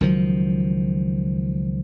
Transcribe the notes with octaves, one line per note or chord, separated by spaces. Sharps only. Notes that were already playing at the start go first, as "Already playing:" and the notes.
C#2 D#3 F3 F#3